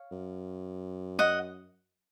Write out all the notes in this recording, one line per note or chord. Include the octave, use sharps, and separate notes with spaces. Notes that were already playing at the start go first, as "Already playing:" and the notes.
Already playing: C#5 F5
F#2
D#5 F#5